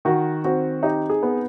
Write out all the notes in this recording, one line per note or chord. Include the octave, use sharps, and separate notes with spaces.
D#3 F#4
C4 F#4
D#4 G4
G#4
B3